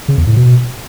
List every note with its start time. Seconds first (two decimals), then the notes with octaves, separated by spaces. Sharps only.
0.08 C#3
0.18 E2
0.27 A2
0.36 B2